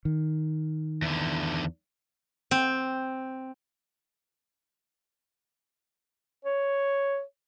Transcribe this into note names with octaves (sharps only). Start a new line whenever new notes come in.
D#3
E2 D3
C4
C#5